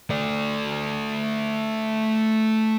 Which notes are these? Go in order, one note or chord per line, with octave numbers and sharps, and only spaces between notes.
A3 D5